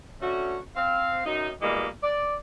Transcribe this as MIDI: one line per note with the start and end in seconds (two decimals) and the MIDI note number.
0.22 0.57 50
0.22 0.57 57
0.22 0.57 61
0.22 0.57 66
0.76 1.25 60
0.76 1.25 77
1.25 1.50 42
1.25 1.50 63
1.61 1.87 47
1.61 1.87 52
1.61 1.87 55
1.61 1.87 56
1.61 1.87 58
2.03 2.35 74